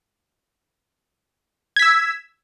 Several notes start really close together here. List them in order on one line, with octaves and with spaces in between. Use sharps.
G#6 B6 E6